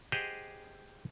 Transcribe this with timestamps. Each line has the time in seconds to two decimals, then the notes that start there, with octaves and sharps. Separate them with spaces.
0.12 G4 G#4 C5 D#5 F#5